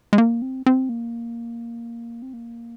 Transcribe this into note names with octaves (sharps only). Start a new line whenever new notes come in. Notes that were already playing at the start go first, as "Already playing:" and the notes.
G#3
A#3
C4
C4
A#3
C4
A#3